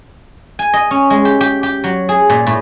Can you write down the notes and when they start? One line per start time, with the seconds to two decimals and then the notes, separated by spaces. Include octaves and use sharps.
0.59 G#5
0.74 D#5
0.91 C#4
1.10 G#3
1.25 G4
1.41 G4
1.63 G4
1.84 F#3
2.09 G#4
2.30 A#2
2.47 A2